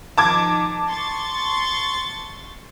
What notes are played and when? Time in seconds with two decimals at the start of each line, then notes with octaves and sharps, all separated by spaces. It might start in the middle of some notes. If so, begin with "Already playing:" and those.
0.18 D#3 F3 D#4 A5 D6 G#6
0.87 C6 C#6 A6